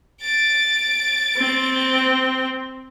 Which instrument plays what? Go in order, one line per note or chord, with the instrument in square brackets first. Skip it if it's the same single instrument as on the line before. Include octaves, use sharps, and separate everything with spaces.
[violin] A6 D7
[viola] C4